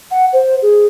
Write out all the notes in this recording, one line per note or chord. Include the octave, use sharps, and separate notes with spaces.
F#5
C5
G#4